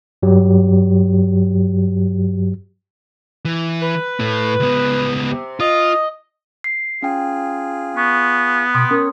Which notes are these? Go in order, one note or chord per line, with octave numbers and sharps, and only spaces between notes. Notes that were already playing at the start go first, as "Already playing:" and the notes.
G2 F#3 G4
E3
B4
A2 A3
C#2 B3
C3
F4 D#5
C7
C#4 F4 G#4 G5
B3 C#6
B2 G5 B5 C6 D#6
C#4 A#4 C#5